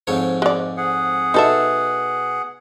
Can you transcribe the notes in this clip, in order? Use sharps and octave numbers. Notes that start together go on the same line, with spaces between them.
F2 G#2 C#5
G#3 D5
G#4 F#5
B2 D#4 A4 E5